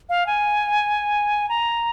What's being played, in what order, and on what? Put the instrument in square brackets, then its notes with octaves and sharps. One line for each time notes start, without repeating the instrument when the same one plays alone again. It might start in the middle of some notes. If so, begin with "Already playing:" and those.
[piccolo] F5
G#5
A#5